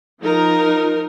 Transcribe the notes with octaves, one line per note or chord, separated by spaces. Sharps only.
F3 D#4 A#4